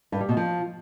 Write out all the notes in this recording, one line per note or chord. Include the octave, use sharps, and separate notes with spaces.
G2
G3
B2
F3